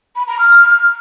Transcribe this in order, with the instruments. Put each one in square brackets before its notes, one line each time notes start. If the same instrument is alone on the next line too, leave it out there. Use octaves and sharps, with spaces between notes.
[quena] B5
A#5
F6